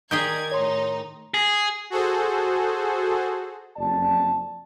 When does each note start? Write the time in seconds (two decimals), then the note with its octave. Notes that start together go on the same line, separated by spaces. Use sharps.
0.11 D#3 G4 G#4 A#4 D5 G6 G#6
0.52 A2 D#4 C#5 C6
1.34 G#4
1.90 F#4 G#4 A4 C5
3.76 F#1 F2 D5 A5